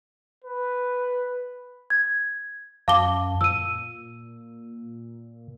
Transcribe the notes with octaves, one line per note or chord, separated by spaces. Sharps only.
B4
G#6
F#2 F5 A5 D6 G7
A#2 E6 D#7